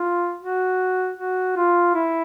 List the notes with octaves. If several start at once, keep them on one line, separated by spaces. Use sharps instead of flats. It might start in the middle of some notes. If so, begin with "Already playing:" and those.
Already playing: F4
F#4
F#4
F4
E4